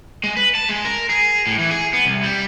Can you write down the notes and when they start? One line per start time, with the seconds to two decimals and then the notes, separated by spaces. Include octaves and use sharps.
0.24 G#3
0.37 B4
0.55 A5
0.69 G#3
0.85 A#4
1.09 G#4
1.47 A2
1.59 E3
1.71 G#4
1.93 B3
2.05 C2
2.23 G3